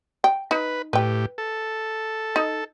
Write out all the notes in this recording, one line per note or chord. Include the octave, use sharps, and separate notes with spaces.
G5
D#4 B4
A2 G4 B4 G5
A4
D#4